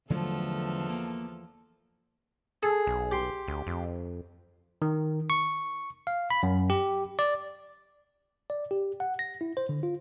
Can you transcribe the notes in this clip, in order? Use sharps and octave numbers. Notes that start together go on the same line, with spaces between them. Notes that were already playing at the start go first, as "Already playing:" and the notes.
E2 D3 F3 F#3 A3 A4
A#3
G#4 A4
B1
G4 C6
D2
F2
D#3
C#6
F5
B5
F#2
G4
D5
D5
G4
F#5
A#6
E4
C5
D3
F4